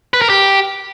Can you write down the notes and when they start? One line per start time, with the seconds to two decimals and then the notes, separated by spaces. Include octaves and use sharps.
0.14 B4
0.22 A#4
0.29 G4